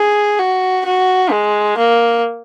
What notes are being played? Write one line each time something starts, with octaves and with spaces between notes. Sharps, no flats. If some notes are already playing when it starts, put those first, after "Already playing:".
Already playing: G#4
F#4
F#4
G#3
A#3